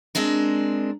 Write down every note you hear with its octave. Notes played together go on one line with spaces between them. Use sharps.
G#3 C4 D4 A#4